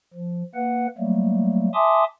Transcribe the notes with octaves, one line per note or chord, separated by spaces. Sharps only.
F3
A#3 B4 F#5
F#3 G3 A3 A#3
E5 G#5 A5 C6 D6 D#6